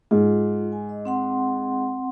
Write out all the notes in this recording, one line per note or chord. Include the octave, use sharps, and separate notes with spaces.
G#2 F4
G#5
D#5
C4 F#5 C6